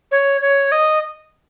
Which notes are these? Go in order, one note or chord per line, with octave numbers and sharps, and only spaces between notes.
C#5
C#5
D#5